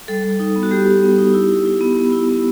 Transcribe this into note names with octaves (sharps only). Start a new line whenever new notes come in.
G3 A4
G3
D#4
B3
F#4
G3 G4
G3
B3
D#4
E4
E4
E4
B3
B3
E4
B3